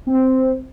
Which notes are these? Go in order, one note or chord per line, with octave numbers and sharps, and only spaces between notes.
C4